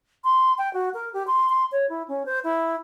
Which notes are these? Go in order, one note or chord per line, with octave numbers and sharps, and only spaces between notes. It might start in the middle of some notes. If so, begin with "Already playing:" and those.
C6
G5
F#4
A#4
G4
C6
C6
C#5
E4
C#4
C5
E4